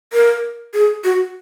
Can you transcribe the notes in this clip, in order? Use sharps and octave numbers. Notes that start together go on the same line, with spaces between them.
A#4
G#4
F#4